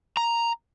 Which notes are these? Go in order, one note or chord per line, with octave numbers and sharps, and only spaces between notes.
A#5